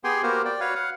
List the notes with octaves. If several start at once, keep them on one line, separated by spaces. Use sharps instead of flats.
B3 G4 G#4 G5 G#5 C6
A#3 B3 F#4 G4 A#4 C5
D5 G5
F#4 B4 C#5 F5
F5 F#5